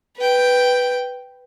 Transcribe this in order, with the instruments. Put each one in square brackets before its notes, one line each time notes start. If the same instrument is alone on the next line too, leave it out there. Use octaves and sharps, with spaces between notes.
[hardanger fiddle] B4 G5